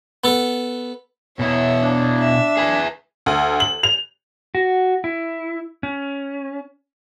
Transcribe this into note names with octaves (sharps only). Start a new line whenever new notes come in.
B3 A4
B2 B3 E4 C#5 E5
D4
E5
G#4 B4
D2
F#7
F7
F#4
E4
C#4